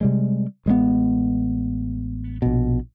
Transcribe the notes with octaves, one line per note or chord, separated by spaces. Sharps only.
C3 G3 G#3
A1 G#3 A3 B3
A#1 B2